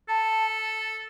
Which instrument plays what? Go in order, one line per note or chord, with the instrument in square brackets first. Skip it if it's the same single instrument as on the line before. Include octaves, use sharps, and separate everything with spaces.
[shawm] A4 [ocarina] A5